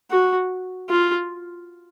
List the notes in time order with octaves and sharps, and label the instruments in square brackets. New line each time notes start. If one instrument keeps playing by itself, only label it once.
[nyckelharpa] F#4
F4